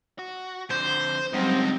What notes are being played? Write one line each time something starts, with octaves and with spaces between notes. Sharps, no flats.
F#4
F2 D3 C5
C#2 F#3 G3 C4 D#4 G4